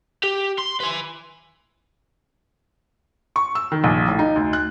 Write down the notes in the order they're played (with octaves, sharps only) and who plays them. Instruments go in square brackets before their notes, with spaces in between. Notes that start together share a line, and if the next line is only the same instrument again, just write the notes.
[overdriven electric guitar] G4
C6
B4 G#5
[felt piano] C#6
E6
D#3
A#1
A2
D#4
D2
F#6